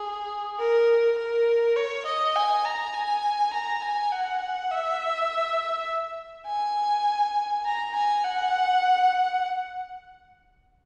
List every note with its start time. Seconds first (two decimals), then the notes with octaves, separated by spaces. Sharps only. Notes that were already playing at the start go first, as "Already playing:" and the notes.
Already playing: G#4
0.59 A#4
1.18 A#4
1.76 C#5
2.06 D#5
2.35 G#5
2.65 A#5
2.94 G#5
3.53 A#5
3.82 G#5
4.12 F#5
4.71 E5
6.47 G#5
7.66 A#5
7.94 G#5
8.24 F#5